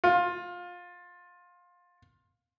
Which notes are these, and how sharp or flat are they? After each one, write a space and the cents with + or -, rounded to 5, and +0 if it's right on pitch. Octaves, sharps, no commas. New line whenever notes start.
F4 +20